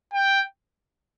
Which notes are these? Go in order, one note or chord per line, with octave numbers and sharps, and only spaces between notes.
G5